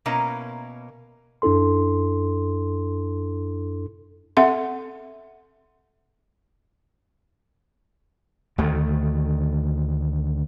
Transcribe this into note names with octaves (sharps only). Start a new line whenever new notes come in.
B2 A#3 C#4 E4 A#5
F#2 D4 E4 A4 C6
C4 A4 E5 F#5 C6
D2 D#3 A3